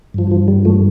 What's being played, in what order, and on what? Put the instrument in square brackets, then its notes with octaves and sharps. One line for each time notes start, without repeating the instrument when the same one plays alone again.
[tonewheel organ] G2 F3
F3
G3
F3 A3